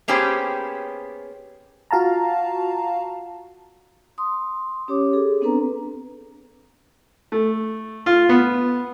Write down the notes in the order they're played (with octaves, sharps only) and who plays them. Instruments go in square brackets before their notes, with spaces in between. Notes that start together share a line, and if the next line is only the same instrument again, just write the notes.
[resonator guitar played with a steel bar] A#3 B3 C#4 G4 G#4 C5
[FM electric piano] F4 F#4 F5 A5 A#5
[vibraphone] C6 D#6
C#4 G4 C#5 D6
G#4 A4
B3 C4 D4 A4 B4 A#5
[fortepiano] A3
F4
B3